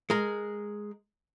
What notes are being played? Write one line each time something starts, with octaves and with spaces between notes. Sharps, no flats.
G#3 A#4